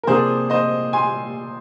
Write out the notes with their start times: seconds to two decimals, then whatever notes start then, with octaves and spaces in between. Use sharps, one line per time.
0.03 A#4
0.07 C3 F3 A#3 D4 G#4 C5
0.50 C5 D#5
0.93 G#5 C6